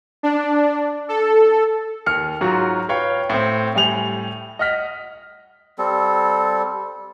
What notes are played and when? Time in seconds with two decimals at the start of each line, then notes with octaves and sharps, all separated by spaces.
0.23 D4
1.09 A4
2.06 D#2 F6 C#7
2.41 G#2 F#3 F4 F#4
2.89 B4 C#5 F5 G5 C#6
3.30 A2 C4
3.75 A2 G3 G#5 F7 F#7
4.59 D#5 F#5 F6 B6
5.78 G3 C4 A4